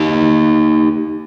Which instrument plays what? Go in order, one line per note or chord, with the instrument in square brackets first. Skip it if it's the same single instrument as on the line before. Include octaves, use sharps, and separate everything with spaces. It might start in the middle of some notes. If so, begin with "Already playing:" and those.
Already playing: [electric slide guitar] D#4 G4